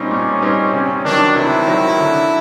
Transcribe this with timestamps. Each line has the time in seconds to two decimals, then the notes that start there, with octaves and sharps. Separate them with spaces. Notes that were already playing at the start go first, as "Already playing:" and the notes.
Already playing: A#2 G3 C4 C#4 D#4
0.11 A#2
0.42 G3 C4 D#4
0.73 C3 C#4
1.04 D#3 F#3 D4
1.35 C3 E4
1.67 D#3 F#3
1.98 D3